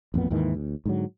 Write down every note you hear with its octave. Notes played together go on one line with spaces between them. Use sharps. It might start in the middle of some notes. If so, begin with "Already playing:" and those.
A1 F2 A#2 B3
D#2 G#2 D#3 E3
D2
G#2 D3 F#3